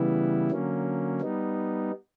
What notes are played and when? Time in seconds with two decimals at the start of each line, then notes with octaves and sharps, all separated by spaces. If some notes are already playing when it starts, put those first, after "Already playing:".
Already playing: C#3 E3 G3 B3 E4
0.51 D3 F#3 A#3 C#4
1.21 G3 B3 D#4